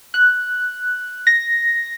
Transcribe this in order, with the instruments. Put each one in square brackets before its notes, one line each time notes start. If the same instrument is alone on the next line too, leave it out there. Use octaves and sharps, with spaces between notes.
[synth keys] F#6
A#6